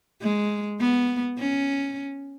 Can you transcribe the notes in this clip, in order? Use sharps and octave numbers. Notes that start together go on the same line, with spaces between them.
G#3
B3
C#4